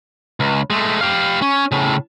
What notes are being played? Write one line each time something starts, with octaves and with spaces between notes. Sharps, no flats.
C#2
G#3 A3
G4 F5
C#4
A2 C#3